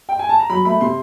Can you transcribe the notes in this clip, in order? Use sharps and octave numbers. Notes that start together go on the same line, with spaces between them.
G5
G#5
A5
A#5
F#3 B5
A3 B5
C3 C6